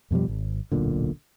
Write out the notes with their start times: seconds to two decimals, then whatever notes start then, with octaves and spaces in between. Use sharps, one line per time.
0.11 F2 B2 F3 G3
0.28 G#1
0.72 D1 B1 A#2 D3